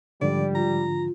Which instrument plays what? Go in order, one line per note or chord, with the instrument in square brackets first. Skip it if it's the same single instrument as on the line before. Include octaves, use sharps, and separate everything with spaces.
[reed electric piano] G#2 D3 F3 [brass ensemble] G3 [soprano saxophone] D5
[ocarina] F4 [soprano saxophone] A#5